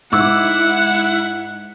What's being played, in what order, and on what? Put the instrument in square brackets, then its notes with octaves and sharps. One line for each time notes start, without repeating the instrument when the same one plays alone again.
[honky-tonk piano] G#2 D6 E6 [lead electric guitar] E4 [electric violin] F#5